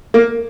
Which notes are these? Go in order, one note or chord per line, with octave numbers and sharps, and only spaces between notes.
A#3